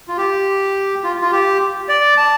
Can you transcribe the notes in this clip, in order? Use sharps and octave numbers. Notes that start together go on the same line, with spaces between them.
F4
G4
F4
F4
G4
D5
A5